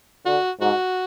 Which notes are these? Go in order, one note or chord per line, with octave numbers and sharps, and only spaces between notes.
D3 F#4
G#2 F#4